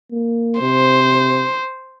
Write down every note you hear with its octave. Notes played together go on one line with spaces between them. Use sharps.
A#3
C3 C5